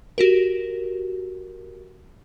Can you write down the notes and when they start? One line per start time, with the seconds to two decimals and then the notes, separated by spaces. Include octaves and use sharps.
0.18 F#4 G4 A#4